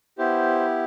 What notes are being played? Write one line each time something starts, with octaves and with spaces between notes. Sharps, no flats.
B3 E4 G4 C5